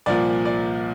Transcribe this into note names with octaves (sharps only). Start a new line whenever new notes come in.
C2 A#2 F3 D5
D5